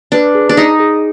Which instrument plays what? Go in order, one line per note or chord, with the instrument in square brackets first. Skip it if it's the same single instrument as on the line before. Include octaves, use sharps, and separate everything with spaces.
[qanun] D4 [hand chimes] B4
[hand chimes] G#4
[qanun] D4
[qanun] D#4 [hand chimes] D#5
[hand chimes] G#4